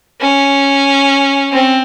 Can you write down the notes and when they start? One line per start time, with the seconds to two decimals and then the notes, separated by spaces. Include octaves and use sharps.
0.21 C#4
1.52 C4